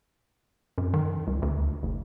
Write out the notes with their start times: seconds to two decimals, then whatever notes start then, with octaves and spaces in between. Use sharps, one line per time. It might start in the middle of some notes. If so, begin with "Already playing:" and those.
0.78 F#2
0.94 D#3
1.27 C#2
1.42 D2
1.83 F#1